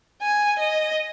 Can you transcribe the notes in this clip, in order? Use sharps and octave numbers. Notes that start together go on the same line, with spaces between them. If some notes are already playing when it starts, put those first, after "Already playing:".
G#5
D#5